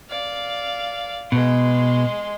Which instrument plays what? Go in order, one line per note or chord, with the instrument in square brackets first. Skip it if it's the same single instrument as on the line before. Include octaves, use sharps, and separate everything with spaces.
[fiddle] D5 F5
[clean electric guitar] B2 [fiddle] G#3 C6